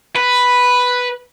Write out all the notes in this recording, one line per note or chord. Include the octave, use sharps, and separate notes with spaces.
B4